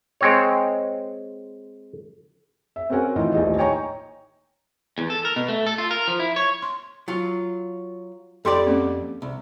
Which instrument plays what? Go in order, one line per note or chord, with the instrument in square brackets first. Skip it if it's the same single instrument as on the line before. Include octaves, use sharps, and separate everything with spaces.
[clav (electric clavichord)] G#3 C4 C#5
[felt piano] E5
C4 C#4 F#4 A#4 F#5 G#5
A2 E3 D#4 F4
D#1 A#1 A2 G4 D#5
D#4 C#5 G5 G#5 A#5 C#6
[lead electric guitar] E2
A4
A#4
B2
A3
A4
F4
A#4
F3
E4
C#5
[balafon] C6
[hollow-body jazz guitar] F#3 F4
[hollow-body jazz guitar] F2 G4 D5 [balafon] A4 C6
[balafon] A#3 C4 C#4
[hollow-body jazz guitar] C2